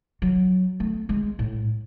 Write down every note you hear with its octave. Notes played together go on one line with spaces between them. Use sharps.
F#3
A3
G#3
A2